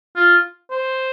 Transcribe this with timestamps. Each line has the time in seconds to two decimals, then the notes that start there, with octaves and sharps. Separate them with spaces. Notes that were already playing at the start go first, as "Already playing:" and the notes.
0.16 F4
0.70 C5